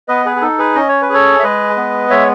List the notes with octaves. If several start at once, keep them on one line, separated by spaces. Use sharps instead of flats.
B3 B4 D#5
G#4 B4
G#4
D#4 A4
G#4 B4
C#4 D#5
C#5
B4
G#4 A4 C#5
E5
G#3 B4 D#5
B3
G#3 C#5 E5